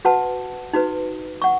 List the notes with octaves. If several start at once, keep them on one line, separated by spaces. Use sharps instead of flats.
F#4 B4 F#5 A5
D#4 F#4 B4
F#5 C#6